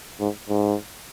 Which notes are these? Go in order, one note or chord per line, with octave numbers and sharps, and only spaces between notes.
G#2
G#2